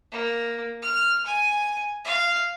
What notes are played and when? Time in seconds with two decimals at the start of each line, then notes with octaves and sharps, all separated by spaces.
0.12 A#3
0.82 F6
1.26 G#5
2.05 F5